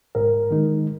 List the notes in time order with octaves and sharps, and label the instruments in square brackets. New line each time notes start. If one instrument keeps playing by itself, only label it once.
[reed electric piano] G#2 [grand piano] A#4
[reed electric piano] D#3 G#3 D#4